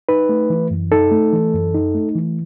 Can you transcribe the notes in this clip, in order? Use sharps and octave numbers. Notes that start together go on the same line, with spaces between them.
D#4 B4
A3
E3
F#2
D#4 A4
A3
E3
F#2
D#4
A3
E3